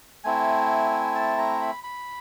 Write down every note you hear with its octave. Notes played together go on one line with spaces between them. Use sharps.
A3 C4 E4 G#5
A5
A#5
B5
B5